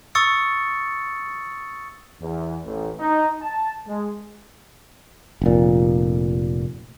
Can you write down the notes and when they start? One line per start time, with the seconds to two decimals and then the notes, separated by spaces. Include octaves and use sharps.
0.15 C#6 D#6 E6 A6 C#7
2.21 E2
2.65 A1
2.99 D#4
3.42 A5
3.88 G#3
5.42 F1 A#2